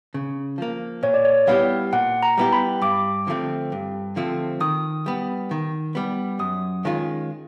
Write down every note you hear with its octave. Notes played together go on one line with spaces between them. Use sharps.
C#3
F3 A#3
A#2 C#5
D5
C#5
G3 B3 E4 G4 F5
A#2 F#5
A#5
G3 B3 E4 G4
B5
G2 D6
D3 F3 A3 C4
G2
D3 F3 A3 C4
D#3 D#6
G3 B3
D#3
G3 B3
F#2 D#6
D#3 G#3 C#4 F4